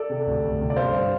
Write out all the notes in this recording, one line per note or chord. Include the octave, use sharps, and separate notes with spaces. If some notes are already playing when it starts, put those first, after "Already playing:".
Already playing: A4 D5
C3
D2
D2
C3
D5
G2 C5 F5
G2